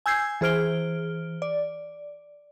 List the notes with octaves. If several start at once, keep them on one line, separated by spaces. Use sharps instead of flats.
G#5 E6 G6 G#6 C7
E3 G#4 C5 F6 D7 G7
D5